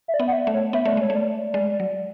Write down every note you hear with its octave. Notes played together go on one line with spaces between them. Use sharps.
E5
D5
B3
F#5
E5
A3
C#5
B3 E5
A3 D5
G#3 C#5
A3
D5
G#3 D5
F#3